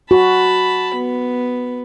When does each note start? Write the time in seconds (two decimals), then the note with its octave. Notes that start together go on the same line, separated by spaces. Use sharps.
0.11 F#4 A5 B5
0.95 B3